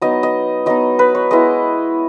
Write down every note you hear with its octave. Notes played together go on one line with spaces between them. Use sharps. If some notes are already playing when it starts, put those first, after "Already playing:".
F#3 B3 D#4 D#5
D#5
F#3 B3 D#4 D#5
B4
C#5
G#3 B3 E4 D#5